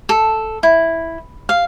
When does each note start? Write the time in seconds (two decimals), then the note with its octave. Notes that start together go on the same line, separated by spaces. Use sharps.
0.09 A4
0.63 E4
1.49 F5